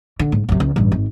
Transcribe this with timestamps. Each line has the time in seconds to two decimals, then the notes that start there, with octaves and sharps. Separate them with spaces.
0.19 D3
0.32 G#2
0.49 F#2 C3
0.60 C#2
0.76 A1 G2
0.92 G#1